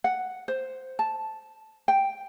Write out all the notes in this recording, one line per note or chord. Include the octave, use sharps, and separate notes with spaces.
F#5
C5
A5
G5